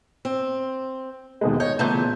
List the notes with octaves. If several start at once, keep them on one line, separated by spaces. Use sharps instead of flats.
C4
D#2 B2 G#3
C#5 D#5 G6
A#2 C#3 E3 A3 B3 G6